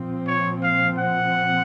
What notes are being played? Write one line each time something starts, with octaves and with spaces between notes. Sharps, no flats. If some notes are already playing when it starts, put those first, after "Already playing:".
Already playing: A#2 F3 C4
C#5
F5
F#5